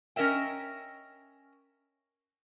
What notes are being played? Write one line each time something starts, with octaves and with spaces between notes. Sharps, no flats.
C#4 A#4 D#5 E5 G5